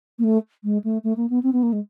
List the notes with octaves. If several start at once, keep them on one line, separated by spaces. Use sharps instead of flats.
A#3
A3
G#3
A3
A3
A#3
B3
C4
B3
A#3
G#3